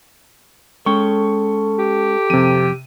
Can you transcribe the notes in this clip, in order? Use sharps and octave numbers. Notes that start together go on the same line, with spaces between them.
G#3 C#4 A4 G5 C#6
G4
F2 C3 D#7